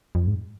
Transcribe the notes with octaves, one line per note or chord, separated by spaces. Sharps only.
F2
G#2